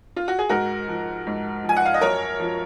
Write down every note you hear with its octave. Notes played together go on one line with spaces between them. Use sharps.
F4
F#4
G#4
G#2 F#4 A#4
F3
G#2
F3 G#5
F#5
F5
D#5
F#2 A#4 C#5
F3